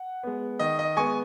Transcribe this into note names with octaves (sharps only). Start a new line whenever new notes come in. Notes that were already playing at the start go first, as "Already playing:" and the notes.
Already playing: F#5
G#3 B3
D#3 D#5
D#5
G#3 B3 G#5 C#6